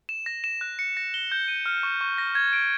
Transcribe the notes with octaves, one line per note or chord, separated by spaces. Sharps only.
E7
A#6
E7
F#6
C#7
A#6
G7
G6
D#7
F6
C#6
C#6
A#6
G#6
D7